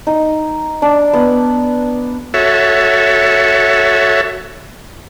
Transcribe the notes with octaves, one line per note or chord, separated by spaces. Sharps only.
D#4
D4
B3
F#4 A4 C#5 E5